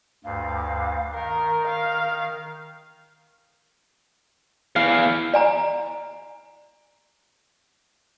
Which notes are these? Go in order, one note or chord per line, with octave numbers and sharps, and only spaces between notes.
D2 G2 F5
D#3 A#4
A#4 F5
E2 E3 F5
D5 G#5 A#5